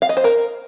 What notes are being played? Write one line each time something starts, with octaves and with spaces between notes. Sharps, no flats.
F5
D#5
C5
A#4